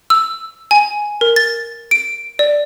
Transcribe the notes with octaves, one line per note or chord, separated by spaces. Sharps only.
E6
G#5
A#4
A6
D7
D5